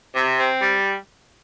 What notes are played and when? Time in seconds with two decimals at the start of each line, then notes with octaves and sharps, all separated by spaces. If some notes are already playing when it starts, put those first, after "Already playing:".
0.15 C3
0.38 C4
0.62 G3